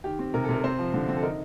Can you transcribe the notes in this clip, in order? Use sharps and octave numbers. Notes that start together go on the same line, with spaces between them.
D#3 G4
C4
C3 A#4
A4
C3 A#4
C4 C5
F3
D3
C4
A4
D#4 A#4